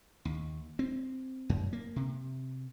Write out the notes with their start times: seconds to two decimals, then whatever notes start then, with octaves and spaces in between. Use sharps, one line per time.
0.25 D#2
0.79 C4
1.49 F#2
1.73 A#3
1.96 C3